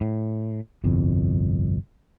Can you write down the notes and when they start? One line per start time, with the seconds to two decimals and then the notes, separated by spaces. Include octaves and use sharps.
0.01 A2
0.84 G1 C2 F2